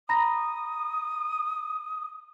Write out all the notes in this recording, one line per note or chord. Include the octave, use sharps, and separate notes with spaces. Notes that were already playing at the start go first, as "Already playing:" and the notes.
A#5 B5 D#6 A#6